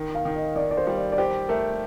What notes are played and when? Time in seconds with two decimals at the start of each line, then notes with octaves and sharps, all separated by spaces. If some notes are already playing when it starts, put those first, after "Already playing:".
Already playing: D#3
0.15 F5
0.25 D#3
0.36 D#5
0.56 D#3 D5
0.71 D5
0.77 C5
0.87 G3
0.97 D5
1.12 D5
1.18 G4 C5
1.49 A3 A#4